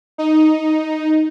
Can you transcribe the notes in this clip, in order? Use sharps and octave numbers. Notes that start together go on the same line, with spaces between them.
D#4